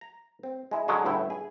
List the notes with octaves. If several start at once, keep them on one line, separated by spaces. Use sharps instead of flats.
A#5
C4
G#3 E4
D3 F#3 G#3 C#4 F#4 G#4
G1 A2 E4 F#5 G5
G#4